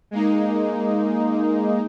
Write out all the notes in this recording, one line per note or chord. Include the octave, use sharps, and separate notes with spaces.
G#3 A#3 D#4